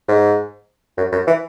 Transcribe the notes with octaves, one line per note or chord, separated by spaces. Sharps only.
G#2
F#2
F#2
E3